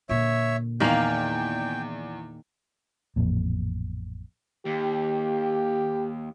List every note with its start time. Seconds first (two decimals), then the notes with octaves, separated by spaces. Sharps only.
0.09 A#2 D3 C#5 E5
0.80 E2 D#3 A#3 F5 G5 F7
3.16 A1 F2 A#2
4.66 D#2 G4